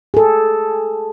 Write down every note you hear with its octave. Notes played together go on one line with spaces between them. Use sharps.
G#4 A4